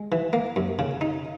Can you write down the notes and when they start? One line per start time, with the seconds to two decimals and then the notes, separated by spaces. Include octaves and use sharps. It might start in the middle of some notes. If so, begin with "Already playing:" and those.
Already playing: G#3
0.12 E3
0.33 A#3
0.56 F#2
0.79 C#3
1.01 D#4